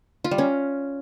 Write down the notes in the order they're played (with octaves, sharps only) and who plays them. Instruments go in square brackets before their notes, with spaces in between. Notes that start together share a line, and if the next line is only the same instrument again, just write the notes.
[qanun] F4
G3
C#4